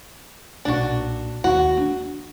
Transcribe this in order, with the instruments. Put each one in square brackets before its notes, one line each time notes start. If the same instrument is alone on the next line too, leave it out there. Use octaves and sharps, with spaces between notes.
[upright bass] B1 A#2 [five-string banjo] D4 F#4
[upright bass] D#2 [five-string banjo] F#4
[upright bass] B3 D4